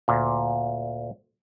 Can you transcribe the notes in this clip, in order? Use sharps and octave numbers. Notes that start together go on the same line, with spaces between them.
D2 A#2